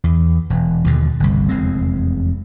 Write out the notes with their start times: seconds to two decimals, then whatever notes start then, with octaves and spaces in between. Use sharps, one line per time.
0.04 E2
0.50 E1
0.84 D#2 B2 D3
1.20 G1 C2
1.49 F1 E2 G#3 C4